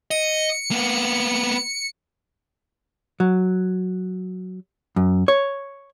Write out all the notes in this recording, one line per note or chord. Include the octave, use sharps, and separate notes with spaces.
D#5 C#7
A#3 B3
F#3
F#2
C#5